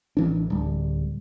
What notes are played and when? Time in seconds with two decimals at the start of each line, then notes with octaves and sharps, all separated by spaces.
0.17 A1 E3 D4
0.50 D1 G3